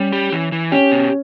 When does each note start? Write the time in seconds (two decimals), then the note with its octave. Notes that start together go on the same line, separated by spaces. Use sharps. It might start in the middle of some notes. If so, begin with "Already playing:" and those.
Already playing: G3 C#4
0.13 G4
0.32 E3
0.52 E3
0.72 C#4 G4
0.92 B2